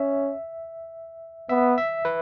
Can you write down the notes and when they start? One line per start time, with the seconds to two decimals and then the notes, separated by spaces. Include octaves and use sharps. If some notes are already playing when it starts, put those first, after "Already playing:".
Already playing: C#4 E5
1.49 B3 E5
1.78 E5
2.05 B4